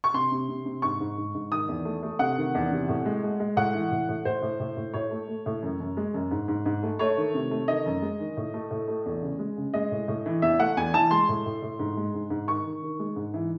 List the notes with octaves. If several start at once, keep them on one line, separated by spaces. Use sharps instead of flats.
C#6
C3 C6
C3
C3
C3
G#2 C#6
G#2
G#2
G#2
D#3 D#6
E2
A3
A3
C3 F#5
D#3
E2
C3
A2
G#3
G#3
G#3
A2 F#5
E3
A2
A2
A2 C5
A2
A2
A2
A2 C#5
A3
A3
A2
F#2
F#2
G#3
F#2
G#2
G#2
G#2
A3
A3 C#5
D#3
C3
A3
D#3 D#5
F#2
G#3
D#3
A2
A3
A2
A3
E2
C#3
G#3
C#3
G#3 D#5
A2
A2
E3
E2 E5
A3 F#5
E2 G#5
E3 A5
G#3 C6
A2
A2
A2
G#2
G#3
G#2
G#2
D#3 C#6
D#3
D#3
G#3
G#2
E3